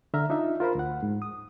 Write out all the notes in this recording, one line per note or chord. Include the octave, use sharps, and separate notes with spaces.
D3 E5 A#5 F6
D4 D#4 F4 E5
F4 A#4 C5 B5
D2 F#5
G#2
D#6